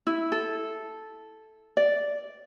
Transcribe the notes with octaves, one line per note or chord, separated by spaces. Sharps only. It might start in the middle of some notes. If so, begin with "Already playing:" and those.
E4
A4
D5